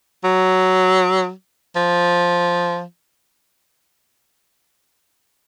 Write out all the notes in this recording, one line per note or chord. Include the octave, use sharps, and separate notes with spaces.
F#3
F3